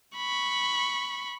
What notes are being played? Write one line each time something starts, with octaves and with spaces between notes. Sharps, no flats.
B5 C#6